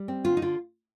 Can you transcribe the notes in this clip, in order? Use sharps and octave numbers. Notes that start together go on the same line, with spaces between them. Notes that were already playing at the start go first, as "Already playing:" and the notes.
Already playing: G3
C4
D3 F4
D#4
D3 F4